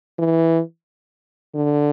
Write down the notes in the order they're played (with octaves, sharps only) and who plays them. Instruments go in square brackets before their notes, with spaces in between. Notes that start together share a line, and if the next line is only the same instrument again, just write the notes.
[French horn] E3
D3